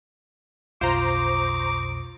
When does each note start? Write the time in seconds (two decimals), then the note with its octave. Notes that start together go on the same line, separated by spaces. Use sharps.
0.81 B1 F2 B2 F4 C5 A#5 D6